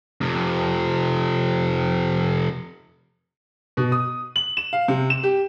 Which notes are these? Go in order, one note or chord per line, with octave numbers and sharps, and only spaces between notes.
F2 C3
B2
D#6
F#7
E7
F5
C3
E7
G4